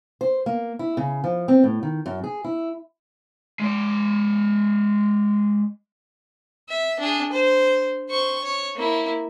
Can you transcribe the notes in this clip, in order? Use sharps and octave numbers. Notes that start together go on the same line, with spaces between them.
C5
A#3
E4
C#3
F3
C4
A2
D#3
F#2
G#4
E4
G#3 D5
E5
D4 G#4
C5
C5 C#6
C#5
A#3 E4